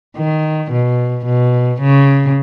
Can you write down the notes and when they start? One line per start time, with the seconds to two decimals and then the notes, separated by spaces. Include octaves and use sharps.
0.17 D#3
0.71 B2
1.26 B2
1.81 C#3